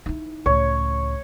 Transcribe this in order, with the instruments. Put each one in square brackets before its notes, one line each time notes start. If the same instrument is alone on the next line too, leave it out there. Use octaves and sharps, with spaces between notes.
[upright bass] D#4 E4
[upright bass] C#2 A2 [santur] C#5